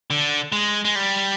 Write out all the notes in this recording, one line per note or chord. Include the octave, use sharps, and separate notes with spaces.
D3
G#3
G#3
G3